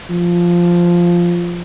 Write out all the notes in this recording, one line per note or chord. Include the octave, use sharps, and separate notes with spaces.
F3